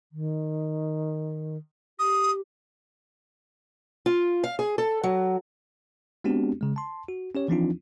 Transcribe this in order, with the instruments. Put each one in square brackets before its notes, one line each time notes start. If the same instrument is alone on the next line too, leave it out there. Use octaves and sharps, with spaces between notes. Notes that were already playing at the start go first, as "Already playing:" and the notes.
[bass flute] D#3
[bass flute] G4 [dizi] D#6
[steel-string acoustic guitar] F4
F5
G#4
A4
F#3
[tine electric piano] G#3 B3 C4 D4 F#4 G4
C#3 G#3
A5 C6
F#4
C#4 G4 C#5
E3 F3 C4 D4 D#4 F4